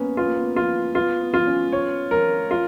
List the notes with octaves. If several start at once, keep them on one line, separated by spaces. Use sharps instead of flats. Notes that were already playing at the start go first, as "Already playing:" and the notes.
Already playing: A#3 B3 C#4
B3 F4
A#3
B3
F4
B3 F4
B3
F4
C#4
C#5
A#4
F4